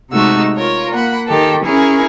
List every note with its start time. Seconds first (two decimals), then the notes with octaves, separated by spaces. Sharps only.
0.10 C3 G#3 A3 D#4 F#4 E6
0.57 F4 A#4 C#5
0.92 A#3 F#5 B5
1.27 D#3 G4 A4
1.65 C#4 E4 G#4 A#4